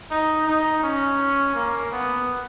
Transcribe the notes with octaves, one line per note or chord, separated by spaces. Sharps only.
D#4
D#4
C#4
A#3
B3